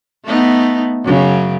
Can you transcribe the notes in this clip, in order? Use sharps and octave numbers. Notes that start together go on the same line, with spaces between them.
A3 B3 D#4
F#2 C#3